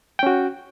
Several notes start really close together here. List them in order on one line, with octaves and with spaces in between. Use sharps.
G5 C#4 F#4